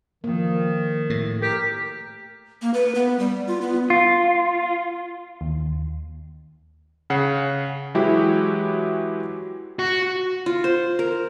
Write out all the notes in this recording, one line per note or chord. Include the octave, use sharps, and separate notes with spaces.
D#3 F3 A#3
A2
G4 A#4
A#3
B4
B3
G3
F4
B3
F4
D#2
C#3 F#5 C7
E3 F#3 G#3 E4 F#4 G4
F#4
F4
C5
A#4